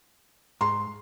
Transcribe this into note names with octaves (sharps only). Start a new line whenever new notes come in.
G#2 A#5 C6